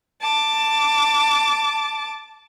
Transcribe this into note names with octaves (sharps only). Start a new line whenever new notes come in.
A5 D6